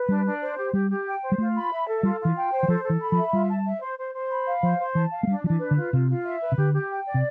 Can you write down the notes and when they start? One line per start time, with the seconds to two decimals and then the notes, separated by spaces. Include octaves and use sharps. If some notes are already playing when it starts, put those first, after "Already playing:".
Already playing: B4
0.09 G3 D4
0.25 D4
0.42 C5
0.57 G4
0.73 G3 G4
0.90 G4
1.06 G5
1.23 C5
1.32 G3
1.38 A3 F4
1.55 B5
1.72 E5
1.87 A4
2.03 G3 F4
2.20 F4
2.25 E3
2.36 G5
2.52 C5
2.63 E3
2.68 F3 A4
2.84 A4
2.90 E3
3.00 B5
3.12 F3
3.17 E5
3.33 G3 F4
3.49 A5
3.66 E5
3.82 C5
3.98 C5
4.15 C5
4.31 B5
4.46 F5
4.63 F3 C5
4.80 C5
4.95 E3 A5
5.11 F5
5.23 A3
5.27 G3 D4
5.44 F3 D4
5.50 E3
5.60 B4
5.71 D3
5.76 F4
5.93 C3 F4
6.09 F4
6.25 E5
6.41 B4
6.52 C3
6.57 D3 G4
6.74 G4
6.90 G5
7.06 D5
7.14 C3